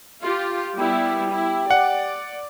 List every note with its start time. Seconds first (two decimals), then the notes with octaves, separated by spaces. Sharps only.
0.21 F4 G4
0.78 G3 B3 E4 G4
1.31 E4
1.71 D5 F#5